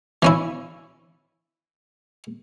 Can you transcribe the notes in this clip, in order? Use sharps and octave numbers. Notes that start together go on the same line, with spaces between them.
E3 C#4 E4